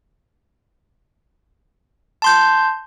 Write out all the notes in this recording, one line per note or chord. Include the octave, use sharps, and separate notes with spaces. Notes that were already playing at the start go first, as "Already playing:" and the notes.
A5 C6 G6